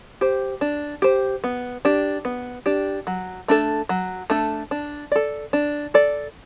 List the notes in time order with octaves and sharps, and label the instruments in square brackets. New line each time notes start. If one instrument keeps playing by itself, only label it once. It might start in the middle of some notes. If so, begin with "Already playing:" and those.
[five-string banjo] G4 C5
D4
G4 C5
B3
D4 G4
B3
D4 G4
F#3
A3 D4 A4
F#3
A3 D4 A4
D4
A4 D5
D4
A4 D5